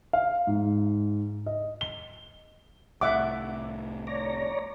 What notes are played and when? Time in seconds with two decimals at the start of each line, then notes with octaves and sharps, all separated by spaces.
0.13 F5
0.47 G#2
1.46 D#5
1.81 G7
3.01 C2 A2 E5 F#5 D6
4.07 C#5 D5 A#5